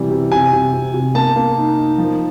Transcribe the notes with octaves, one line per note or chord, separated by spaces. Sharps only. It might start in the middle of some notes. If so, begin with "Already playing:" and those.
Already playing: C3 E3 G3
C3
C3 G#5
C3
C3
C3
A#3 A5
A#3
D#4
D#4
F3